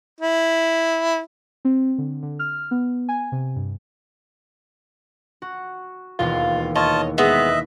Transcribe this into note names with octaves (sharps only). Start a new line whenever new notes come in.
E4
C4
D3
D3
F6
B3
G#5
C3
G2
F#4
E1 D#2 F4 F5
F4 C#5 D#5 A5
G#3 B3 B4 D#5 E5